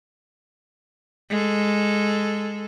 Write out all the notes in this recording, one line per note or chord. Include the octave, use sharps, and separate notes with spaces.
G#3 A4